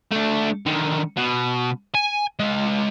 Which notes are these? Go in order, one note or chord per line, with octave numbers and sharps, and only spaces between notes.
A3 D4
D3 D#3
B2
G#5
G#3 F4